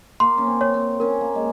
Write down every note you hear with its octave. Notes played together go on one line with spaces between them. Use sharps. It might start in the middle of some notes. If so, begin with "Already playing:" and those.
A#3 C6
C#4
C4
C#5
C4
C#4 A#4
A#3
G#3